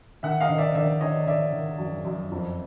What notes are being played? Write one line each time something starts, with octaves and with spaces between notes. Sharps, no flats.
D#3 E5 F#5
D#5 F5
D#3
D5 E5
D#3 D5 E5
D#3 C#5 D#5
D#3 D5 E5
D#3
F#2
F#2
F2